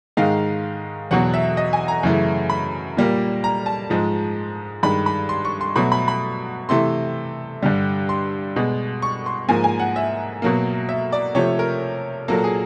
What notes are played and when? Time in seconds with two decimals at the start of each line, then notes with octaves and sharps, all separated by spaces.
0.17 G#2 D#3 G#3 F5
1.11 E2 B2 F#3 F#5
1.34 E5
1.57 D#5
1.73 G#5
1.88 A#5
2.03 F#2 C#3 E3 A3
2.50 B5
2.97 A#2 G3 A#3
3.44 A#5
3.66 A5
3.90 G#2 F3 G#3
4.83 G2 D#3 G#3 B5
5.06 B5
5.29 C6
5.45 C#6
5.61 C6
5.76 B2 F#3 A3 B5
5.92 B5
6.08 B5
6.69 C3 E3 A3 C6
7.63 G2 D3 G3
8.09 C6
8.56 B2 G#3
9.02 C#6
9.26 C6
9.48 G#2 F3 A#3 G#5
9.64 G#5
9.79 F#5
9.96 E5
10.42 B2 F#3 A#3
10.89 E5
11.12 D5
11.35 C3 F3 A3 C#5
11.59 A#4
12.28 A#2 F#3 A#3 A4
12.44 G#4